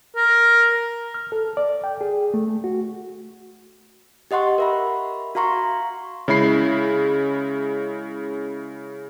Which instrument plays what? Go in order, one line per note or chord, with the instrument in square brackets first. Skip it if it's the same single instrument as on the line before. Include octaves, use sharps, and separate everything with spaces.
[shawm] A#4
[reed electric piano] F6
A4
D5
G5
G#4
A3
F#4
[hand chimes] G4 D#5 F#5 C6 C#6
A#4 E5 B5
F#4 F5 A#5 C6 C#6
[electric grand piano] C#3 G#3 E4 B5 C7